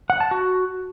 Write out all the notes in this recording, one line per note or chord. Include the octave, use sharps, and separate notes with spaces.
F#5
A5
F#4